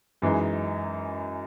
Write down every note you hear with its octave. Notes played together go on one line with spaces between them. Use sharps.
F#2 E3 G#3 D#4